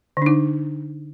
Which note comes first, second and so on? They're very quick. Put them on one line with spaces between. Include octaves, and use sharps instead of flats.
D3 D4 D#4